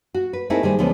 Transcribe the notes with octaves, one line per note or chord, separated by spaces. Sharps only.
F#4
B4
A3 C4 D#4 E4 G#4 A#4
D#3 G3 G#4 C5
D2 A#2 F3 G#3 B3 C#4